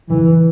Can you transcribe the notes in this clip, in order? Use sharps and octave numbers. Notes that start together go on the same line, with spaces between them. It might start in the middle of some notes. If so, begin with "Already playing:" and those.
E3